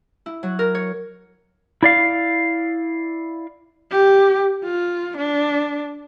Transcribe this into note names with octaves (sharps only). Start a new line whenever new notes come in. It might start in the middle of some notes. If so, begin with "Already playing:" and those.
E4
F#3
A#4
C#5
E4 D5 F5
G4
F4
D4